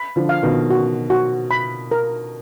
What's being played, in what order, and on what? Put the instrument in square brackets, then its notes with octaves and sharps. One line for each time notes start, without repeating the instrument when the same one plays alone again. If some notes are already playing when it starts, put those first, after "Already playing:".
Already playing: [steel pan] B5
[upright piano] D3 F3
[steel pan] F5
[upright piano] B2 D#3
[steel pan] F#4
F#4
B5
A#4